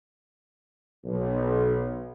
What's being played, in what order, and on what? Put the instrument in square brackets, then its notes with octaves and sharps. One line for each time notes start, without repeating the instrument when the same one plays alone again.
[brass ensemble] B1